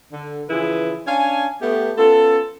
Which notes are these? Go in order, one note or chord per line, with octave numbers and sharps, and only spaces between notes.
D3
C#3 E3 F3 E4 G#4 B4
C#4 D4 F5 G#5
A3 B3 G4
B3 C#4 F4 A4